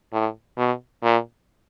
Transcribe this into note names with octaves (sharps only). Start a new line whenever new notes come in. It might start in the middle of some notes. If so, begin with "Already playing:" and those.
A2
B2
A#2